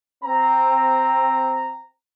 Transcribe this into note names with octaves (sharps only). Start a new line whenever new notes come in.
C4 A#5